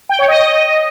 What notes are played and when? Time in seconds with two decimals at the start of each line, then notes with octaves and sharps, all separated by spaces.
0.09 G5
0.19 C#5
0.28 D#5